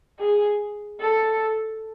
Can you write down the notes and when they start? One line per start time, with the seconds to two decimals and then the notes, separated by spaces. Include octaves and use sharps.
0.19 G#4
1.01 A4